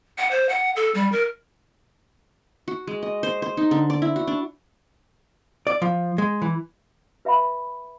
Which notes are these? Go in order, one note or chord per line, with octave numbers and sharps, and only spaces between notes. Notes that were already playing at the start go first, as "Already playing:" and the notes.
F#5
C5
F#5
A4
G3
A#4
F#4
G#3
D#5
C5
C5
D#4
D3
D5
E4
F#4
D4
D5
F3
G#3
E3
B4 E5 F#5 B5